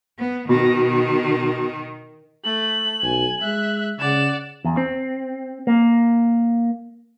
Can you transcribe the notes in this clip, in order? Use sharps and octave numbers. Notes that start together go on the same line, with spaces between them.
B3
B2 D#3
A3 F#7
B1 G#5
G#3 E5 F#6
C#3 D5 F#5 E7
E2
C4
A#3